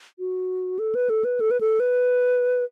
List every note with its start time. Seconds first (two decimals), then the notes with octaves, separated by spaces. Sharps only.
0.19 F#4
0.79 A4
0.95 B4
1.10 A4
1.25 B4
1.40 A4
1.51 B4
1.61 A4
1.80 B4